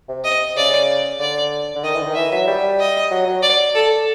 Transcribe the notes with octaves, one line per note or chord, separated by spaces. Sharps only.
C3
D#5
C#3 D5
D3 D5
D3
D#3 D#5
E3
D3
D#3
E3 E5
F#3
G3
D#5
F#3
F#3
D5
A4